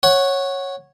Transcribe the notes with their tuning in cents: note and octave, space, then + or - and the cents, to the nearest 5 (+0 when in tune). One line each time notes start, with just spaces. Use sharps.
C#5 -10 F#5 +0